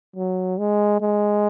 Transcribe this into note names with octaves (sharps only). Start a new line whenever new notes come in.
F#3
G#3
G#3